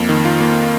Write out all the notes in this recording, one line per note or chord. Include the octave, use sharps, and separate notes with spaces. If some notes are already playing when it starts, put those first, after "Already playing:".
Already playing: F2 A#3
D#3
F4
A#3